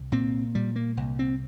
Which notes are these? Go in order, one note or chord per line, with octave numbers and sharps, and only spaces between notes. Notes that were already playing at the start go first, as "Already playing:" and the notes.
Already playing: C2
A#2 C4
A#2 G3
A#3
C2
C4